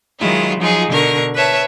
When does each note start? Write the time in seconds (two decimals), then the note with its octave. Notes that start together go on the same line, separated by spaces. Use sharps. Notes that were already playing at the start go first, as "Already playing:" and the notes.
0.19 D#3 F#3 G#3 E4 F4
0.60 F3 F#3 D#4 F4 G#4
0.89 B2 D3 A#4 C#6
1.35 B4 C#5 E5 A5